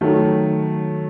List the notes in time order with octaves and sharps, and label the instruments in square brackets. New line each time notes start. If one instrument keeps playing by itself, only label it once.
[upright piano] D#3 F#3 A3